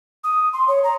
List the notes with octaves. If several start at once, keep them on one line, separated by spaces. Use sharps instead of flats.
D#6
C6
C#5
A#5